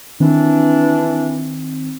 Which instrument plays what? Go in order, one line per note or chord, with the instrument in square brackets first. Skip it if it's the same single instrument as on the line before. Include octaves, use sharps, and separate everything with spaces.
[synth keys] D#3 C4 [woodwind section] E3 D4